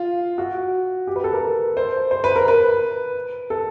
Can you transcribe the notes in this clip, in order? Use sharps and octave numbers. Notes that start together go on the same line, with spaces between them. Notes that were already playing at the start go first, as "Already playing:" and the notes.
Already playing: F4
F#4
G4
B4
A4
A#4
C5
C5
B4
A#4
B4
A4